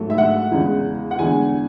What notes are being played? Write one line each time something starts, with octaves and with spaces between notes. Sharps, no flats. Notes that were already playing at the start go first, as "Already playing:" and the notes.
Already playing: G#2 F#3 A3
E5
F#5
E2 C#3 G#3
F#5
E2 D3 G#3 G#5